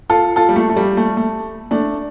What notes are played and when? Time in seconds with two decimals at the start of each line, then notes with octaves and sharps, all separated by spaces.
0.10 F4 A4
0.36 F4 A4
0.49 G3
0.56 A3
0.70 A3
0.77 G3
0.97 A3
1.17 A3
1.71 A3 D4